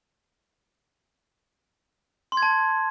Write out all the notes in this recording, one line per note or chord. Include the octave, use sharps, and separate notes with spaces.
C6
G#6
A5